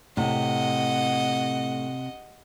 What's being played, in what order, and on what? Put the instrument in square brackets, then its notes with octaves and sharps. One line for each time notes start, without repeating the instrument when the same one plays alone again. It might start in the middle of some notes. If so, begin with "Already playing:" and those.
[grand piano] A2 [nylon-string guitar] C3 [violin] D#5 F#5